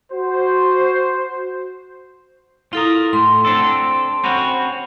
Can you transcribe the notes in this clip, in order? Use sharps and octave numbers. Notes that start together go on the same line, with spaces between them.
F#4 C5
E4 F4 A4 A#4 D#6
A2 C6
C4 D4 A4
C4 C#4 F#4 B5